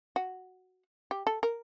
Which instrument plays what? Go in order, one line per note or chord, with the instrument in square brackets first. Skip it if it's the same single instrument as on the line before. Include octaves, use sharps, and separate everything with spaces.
[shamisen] F#4
G4
A4
A#4